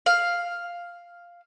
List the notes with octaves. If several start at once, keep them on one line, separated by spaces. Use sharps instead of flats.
F5